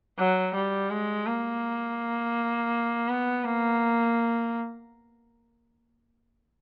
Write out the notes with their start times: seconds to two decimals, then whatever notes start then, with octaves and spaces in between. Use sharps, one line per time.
0.18 F#3
0.55 G3
0.91 G#3
1.27 A#3
3.08 B3
3.45 A#3